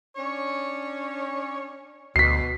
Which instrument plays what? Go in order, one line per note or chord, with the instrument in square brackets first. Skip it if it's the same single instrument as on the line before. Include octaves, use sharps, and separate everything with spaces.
[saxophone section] C#4 D4 C#5
[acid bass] D2 [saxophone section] B2 [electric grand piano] B6 C7